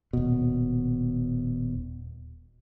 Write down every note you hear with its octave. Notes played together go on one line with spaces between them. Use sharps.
D#1 B2